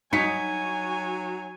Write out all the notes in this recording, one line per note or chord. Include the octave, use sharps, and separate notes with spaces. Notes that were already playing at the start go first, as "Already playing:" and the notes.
F#3 D#4 G#5 B6 C#7